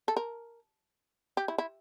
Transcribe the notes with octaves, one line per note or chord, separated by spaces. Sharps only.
A4
A#4
G4
E4
E4